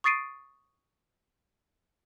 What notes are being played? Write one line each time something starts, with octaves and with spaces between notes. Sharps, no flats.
C#6 D#6 A6 C7 D7 D#7